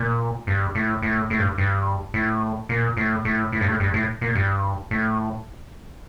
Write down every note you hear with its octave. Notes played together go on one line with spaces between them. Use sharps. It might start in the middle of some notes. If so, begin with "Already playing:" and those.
Already playing: A#2
G2
A2
A2
A2
G2
G2
A2
A#2
A2
A2
A2
G2
A2
G2
A2
A#2
G2
A2